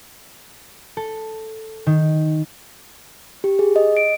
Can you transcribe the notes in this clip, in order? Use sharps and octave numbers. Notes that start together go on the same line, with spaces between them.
A4
D#3
G4
G#4
D#5
D7